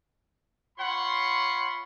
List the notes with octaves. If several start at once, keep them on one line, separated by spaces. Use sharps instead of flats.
F4 C#5 F#5 B5 C6